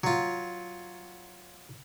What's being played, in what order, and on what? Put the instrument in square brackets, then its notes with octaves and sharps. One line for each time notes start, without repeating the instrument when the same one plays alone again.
[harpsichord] F#3 F4